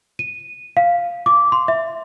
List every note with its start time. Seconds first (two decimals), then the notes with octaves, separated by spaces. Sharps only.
0.19 D#7
0.77 F5
1.26 D6
1.52 C6
1.68 E5